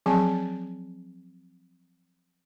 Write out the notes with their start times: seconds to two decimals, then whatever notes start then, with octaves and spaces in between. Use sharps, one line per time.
0.06 F3 F#3 C4 G#4 G#5 A5